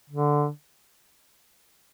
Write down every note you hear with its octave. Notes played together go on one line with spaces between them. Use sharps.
D3